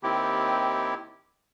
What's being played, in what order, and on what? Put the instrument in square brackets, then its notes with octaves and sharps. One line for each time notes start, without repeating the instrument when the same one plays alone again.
[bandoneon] D#2 D#3 C4 E4 G4